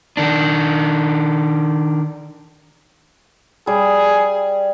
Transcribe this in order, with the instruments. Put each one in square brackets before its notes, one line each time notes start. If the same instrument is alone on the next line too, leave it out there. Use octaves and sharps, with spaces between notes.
[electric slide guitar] D#3 D4
[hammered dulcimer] G3 [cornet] G#4